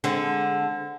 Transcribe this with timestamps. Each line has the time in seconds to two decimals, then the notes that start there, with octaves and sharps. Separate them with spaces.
0.04 D3 G#3 C4